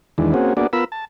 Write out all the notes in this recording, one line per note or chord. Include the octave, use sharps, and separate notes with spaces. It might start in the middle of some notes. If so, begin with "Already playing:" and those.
E2 D#3 E3 G#3 D4
A#3 C4 C#4 F#4 G#4
A#3 B3 D4 F#4 G#4 D5
B3 F4 A#4 B5 E6
A5